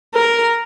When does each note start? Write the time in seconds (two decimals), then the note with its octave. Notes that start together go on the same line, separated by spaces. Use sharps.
0.15 A#4